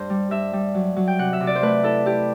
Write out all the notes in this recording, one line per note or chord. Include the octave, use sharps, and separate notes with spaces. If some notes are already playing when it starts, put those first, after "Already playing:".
Already playing: G2 C5
G3
G2 E5
G3
F#3
F#3
G5
C3 F#5
E5
C3
D5
C5
A3 B4
E4 A4
E4 G4